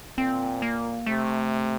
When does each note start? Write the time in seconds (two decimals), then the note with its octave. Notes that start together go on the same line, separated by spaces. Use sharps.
0.18 A#2 C4
0.62 A#3
1.06 C3 A3